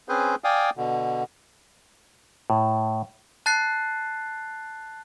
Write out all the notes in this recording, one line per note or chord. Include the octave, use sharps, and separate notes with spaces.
C4 C#4 G#4 B4 C5
D5 F5 G5 G#5 D#6
B2 D3
A2
A5 F#6 A6 C7